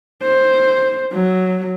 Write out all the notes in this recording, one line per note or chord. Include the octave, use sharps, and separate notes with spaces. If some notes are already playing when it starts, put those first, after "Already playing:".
C5
F#3